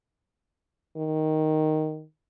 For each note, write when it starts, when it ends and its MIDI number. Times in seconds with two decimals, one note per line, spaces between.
0.97 2.03 51